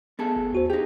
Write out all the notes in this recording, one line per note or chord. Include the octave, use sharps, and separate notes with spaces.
B3 G#4 A4
G1
D#2 F#4 C5
D#4 G4 G#4